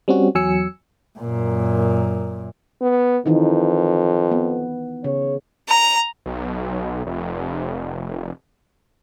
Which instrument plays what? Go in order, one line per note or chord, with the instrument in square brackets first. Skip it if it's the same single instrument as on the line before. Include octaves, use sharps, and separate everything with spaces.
[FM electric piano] G3 C4 C#4 F#4
E2 F#3 G#5 E6 C#7
[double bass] F#2 A#2
[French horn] B3
[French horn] F2 [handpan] D#3 E3 D#4
[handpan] B3
[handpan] C#3 [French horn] C#5
[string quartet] A#5
[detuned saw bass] B1
F1